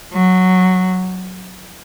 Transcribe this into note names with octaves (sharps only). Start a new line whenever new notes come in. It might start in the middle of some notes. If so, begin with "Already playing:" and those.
F#3